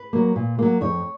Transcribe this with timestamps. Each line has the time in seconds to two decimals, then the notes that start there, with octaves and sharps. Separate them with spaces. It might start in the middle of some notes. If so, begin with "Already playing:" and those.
Already playing: B4
0.13 F#3 A#3
0.36 A#2
0.59 F#3 A#3
0.81 F2 C#5